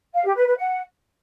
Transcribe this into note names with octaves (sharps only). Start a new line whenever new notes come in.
F5
G4
B4
B4
F#5